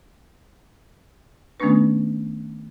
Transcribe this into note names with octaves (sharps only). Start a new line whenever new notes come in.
D#3 A3 B3 C#4 D4 B4